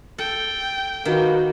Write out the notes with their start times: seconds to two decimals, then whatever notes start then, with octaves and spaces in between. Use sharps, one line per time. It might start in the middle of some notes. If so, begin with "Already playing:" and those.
0.18 A4 G5
1.05 D#3 A#3 F#4 B4